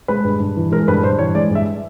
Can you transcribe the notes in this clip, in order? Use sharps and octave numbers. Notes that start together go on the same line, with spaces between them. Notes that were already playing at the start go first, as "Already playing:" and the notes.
G#3 B4
G2
G2
E3
G#3 A#4
G2 B4
G2 C5
E3 C#5
G#3 D5
G2
E5